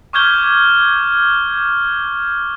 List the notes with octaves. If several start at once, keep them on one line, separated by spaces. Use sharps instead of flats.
C#6 D6 F6 G6 G#6 G7